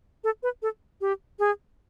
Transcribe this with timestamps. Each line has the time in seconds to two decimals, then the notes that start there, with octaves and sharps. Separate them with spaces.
0.24 A4
0.43 B4
0.62 A4
1.01 G4
1.39 G#4